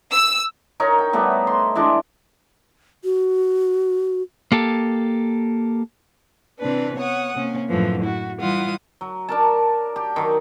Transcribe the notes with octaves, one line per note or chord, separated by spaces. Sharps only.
E6
D#4 A#4 C#5
G5
G3 A3 B3
C6
E3 G#3 D4
F#4
A#3 G4 A4
C3 E3 C4 D4 B4
B3 C#5 F#5 D#6
C3 A#3 C#4
F#2 A2 D3 E3 F3
E4 F#4
E3 G3 E4 F4 F#5 D#6
F#3
D4 A#4 A5
G4
D#3 F#3